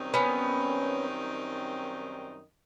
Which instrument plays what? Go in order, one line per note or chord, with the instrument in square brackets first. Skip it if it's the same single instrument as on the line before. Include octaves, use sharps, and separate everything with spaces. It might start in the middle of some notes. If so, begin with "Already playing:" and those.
Already playing: [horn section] F#2 D#3 G3 C4 D#4
[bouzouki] B3 C#4